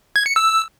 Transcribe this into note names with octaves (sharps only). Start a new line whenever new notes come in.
G#6
C#7
E6